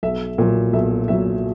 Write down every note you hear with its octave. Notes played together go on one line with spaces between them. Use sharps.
B1 E5
A#2 F#3
B1 E5
A#2 F#3 E5